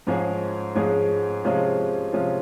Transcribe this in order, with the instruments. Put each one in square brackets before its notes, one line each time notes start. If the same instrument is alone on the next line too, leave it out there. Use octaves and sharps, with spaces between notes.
[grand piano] G#2 F3 G#3 C#4 G#4
G#2 F3 G#3 C#4 G#4
C3 F3 G#3 C#4 F4
C3 F3 G#3 C#4 F4